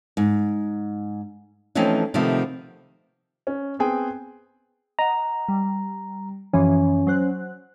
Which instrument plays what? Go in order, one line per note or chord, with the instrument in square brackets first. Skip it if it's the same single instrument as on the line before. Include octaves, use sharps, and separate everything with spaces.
[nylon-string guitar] G#2
E3 F3 A3 C4 C#4 D#4
C3 D#3 F3 A3 B3
[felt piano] C#4
B3 C4 G#4 G5
[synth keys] D#5 F#5 [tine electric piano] A#5
[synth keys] G3
[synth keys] F#2 E3 F3 [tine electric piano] C#4
[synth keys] F#3 C5 F#6